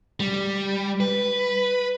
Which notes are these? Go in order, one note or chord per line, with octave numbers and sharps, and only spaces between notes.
G3
B4